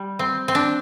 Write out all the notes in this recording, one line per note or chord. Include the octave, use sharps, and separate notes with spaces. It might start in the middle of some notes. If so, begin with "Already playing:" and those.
Already playing: G3
C4
C4
D4